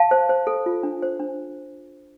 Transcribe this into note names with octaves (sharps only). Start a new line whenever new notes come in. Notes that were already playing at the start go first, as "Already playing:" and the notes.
Already playing: F5 A5
C5
C5
A4
F4
D4
C5
D4